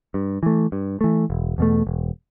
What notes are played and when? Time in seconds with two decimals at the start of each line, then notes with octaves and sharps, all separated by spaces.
0.14 G2
0.43 E3 A3
0.72 G2
1.01 E3 A3
1.30 E1
1.58 E2 B2 A3
1.87 E1